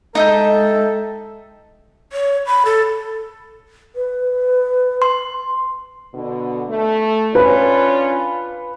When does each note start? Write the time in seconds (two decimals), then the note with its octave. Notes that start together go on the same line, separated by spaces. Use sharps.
0.15 G#3 D#4 A4 D#5 E5 G5
2.12 C#5
2.46 B5
2.65 A4
3.95 B4
5.02 C6
6.13 B2 D3
6.68 A3
7.35 C#4 D4 F4 B4